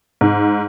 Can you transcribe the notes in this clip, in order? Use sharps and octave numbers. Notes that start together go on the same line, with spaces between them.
G#2